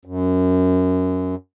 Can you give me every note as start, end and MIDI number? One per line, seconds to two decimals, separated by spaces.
0.05 1.35 42